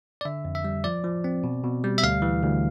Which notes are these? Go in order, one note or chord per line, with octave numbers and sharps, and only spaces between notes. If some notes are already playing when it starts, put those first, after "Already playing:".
D5
D3 E5
F2
E5
G3
F3 D5
F3
C4
B2
B2
G3
E5
D2 F5
E3
D2